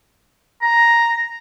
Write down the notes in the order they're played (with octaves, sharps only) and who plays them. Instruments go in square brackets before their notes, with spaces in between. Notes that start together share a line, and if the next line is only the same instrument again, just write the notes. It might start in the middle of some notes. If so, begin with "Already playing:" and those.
[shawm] A#5